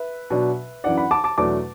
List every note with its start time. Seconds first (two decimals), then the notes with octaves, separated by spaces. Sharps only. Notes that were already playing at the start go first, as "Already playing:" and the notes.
Already playing: B4 E5
0.30 B2 F#3 D4
0.84 F#2 E3 D4 D5 F#5
0.97 F#5 B5
1.11 A5 D6
1.24 A5 D6
1.38 E2 B2 F#3 A3 D4 A5 D6